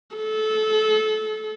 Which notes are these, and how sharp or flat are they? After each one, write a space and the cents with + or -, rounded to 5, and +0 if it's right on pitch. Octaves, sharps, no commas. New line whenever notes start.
A4 -25